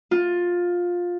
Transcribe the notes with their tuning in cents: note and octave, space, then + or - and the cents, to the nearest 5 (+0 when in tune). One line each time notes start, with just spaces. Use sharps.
F4 +15